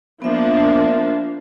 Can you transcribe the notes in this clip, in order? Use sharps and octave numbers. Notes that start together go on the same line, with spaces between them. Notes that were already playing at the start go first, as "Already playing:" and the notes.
F3 A#3 B3 D4 E5